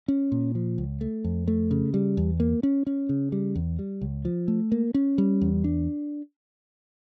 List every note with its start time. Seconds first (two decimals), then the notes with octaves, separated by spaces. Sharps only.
0.08 C#4
0.32 A#2
0.55 F3
0.78 C#2
1.01 A3
1.24 F2
1.48 A3
1.71 C#3
1.94 G3
2.17 E2
2.40 A#3
2.63 C#4
2.87 C#4
3.09 C#3
3.32 G3
3.55 E2
3.79 G3
4.01 C#2
4.25 F3
4.48 A3
4.72 A#3
4.94 C#4
5.18 G3
5.41 E2
5.64 D4